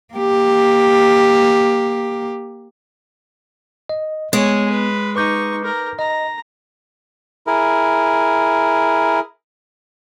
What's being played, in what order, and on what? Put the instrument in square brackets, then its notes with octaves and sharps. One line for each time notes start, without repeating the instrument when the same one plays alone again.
[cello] A#3 G4
[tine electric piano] D#5
[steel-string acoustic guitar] G#3 [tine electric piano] B3 [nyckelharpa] C#5 G#5
[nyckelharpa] B4
[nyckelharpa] D#4 C#6 [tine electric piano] B4 D6 G6
[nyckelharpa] A#4
[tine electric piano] D#5 [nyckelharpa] A#5
[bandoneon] E4 G#4 A#4